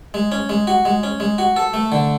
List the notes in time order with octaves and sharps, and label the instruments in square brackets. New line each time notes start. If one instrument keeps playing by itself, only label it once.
[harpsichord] G#3
C#4
G#3
F#4
G#3
C#4
G#3
F#4
A4
A3
D3